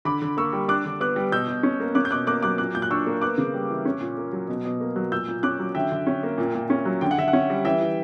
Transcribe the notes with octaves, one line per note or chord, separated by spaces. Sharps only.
D3 B5 D6
D3
A#3 C#6 E6
G3
D4 D6 F#6
D3
B3 D6 F#6
G3
B2 E6 G6
B2
C#4
A#3
C#4 D6 F#6
G6
B2 D6 F#6
A#3 D6 F#6
F#3 D6 F#6
A#2 D6 F#6
A#2 G6
F#6
D4 C#6 E6
A#3
B3 D6 F#6
C#3
G3
E3
C#4
A#2
A#3
F#3
B2
B2
A#3
F#3
A#2 E6 G6
A#2
C#4 D6 F#6
F#3
D3 E5 G5
D3
C#4
A#3
A#2
A#2
C#4
F#3
D3 G5
F#5
D3 E5
F#5
C#4
G3
E3 E5 G5
E3